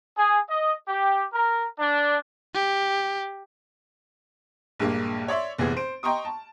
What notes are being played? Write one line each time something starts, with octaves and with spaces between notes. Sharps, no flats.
G#4
D#5
G4
A#4
D4
G4
A#1 G2 G#3 A#3
C#5 D5 E5 C6
F1 A#2 E3 B3 G#4
C5 D7
D#5 G5 A#5 C6 C#6 D#6
A5